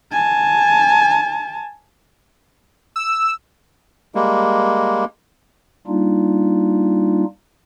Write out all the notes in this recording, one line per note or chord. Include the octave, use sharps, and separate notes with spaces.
G#5 A5
E6
G3 G#3 A#3
G3 A#3 D4 D#4 F4